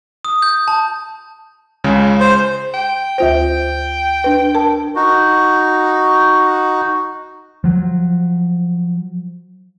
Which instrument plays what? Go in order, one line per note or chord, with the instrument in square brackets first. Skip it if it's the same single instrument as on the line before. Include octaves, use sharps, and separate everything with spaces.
[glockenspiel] D#6
G6
A5
[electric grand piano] C#2 C#3 G#3
[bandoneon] C5
[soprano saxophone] G5
[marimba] D2 F4 C5 [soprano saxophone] G5
[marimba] D4 B4
A#4 A5
[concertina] D#4 F#4
[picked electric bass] F3 F#3